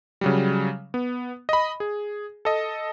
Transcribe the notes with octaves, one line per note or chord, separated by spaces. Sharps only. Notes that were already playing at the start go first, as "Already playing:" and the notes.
C#3 F#3 G3
B3
D#5 B5
G#4
A4 D#5